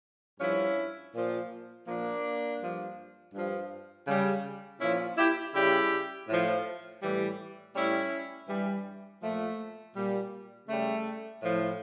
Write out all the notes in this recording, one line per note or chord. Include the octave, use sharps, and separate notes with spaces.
G2 F3 C#4 E4
A#2 F3
A#2 F3 A#3 D4
G2 F3
G2 F3
C#3 G3
A#2 F3 C#4 E4
E4 G4
C#3 G3 E4 G4
A2 F3
A2 E3 G3
A2 G3 C#4 E4
G2 E3 G3
A#2 F3 A3
A#2 G3
C#3 G3 A3
A2 F3